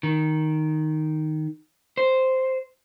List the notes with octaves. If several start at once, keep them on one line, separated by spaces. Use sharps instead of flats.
D#3
C5